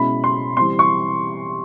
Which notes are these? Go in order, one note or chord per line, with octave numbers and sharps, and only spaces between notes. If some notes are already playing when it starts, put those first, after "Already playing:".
Already playing: B2 G#3 C#4 E4 B5
C6
E3 G3 C4 C6
C#6